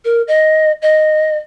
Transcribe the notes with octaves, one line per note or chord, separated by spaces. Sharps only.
A#4
D#5
D#5